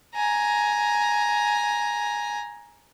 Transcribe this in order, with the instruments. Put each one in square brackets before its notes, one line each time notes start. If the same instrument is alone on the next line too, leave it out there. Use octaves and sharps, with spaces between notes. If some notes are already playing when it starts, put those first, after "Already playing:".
[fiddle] G#5 A#5